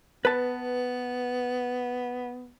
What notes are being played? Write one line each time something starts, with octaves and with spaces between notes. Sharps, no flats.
B3 B4 A5